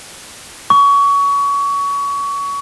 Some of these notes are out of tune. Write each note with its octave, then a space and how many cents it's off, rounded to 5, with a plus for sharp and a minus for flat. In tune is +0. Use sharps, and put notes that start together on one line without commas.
C#6 +25